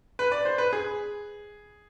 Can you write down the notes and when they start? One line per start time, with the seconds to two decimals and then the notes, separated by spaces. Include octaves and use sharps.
0.19 B4
0.32 D5
0.45 C5
0.58 B4
0.73 G#4